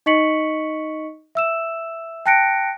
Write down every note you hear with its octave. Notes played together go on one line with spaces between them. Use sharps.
D#4 D#5 C#6 B6 C#7 F#7
E5 E6 E7
G5 A5 F#6 A#6 C#7 D7